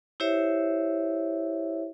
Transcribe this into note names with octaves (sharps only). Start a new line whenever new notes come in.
E4 G4 C5 C#5 E5